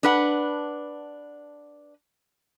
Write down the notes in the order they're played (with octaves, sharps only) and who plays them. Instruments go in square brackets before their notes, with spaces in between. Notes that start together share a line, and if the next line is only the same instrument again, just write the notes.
[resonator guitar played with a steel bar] D4 B4 F#5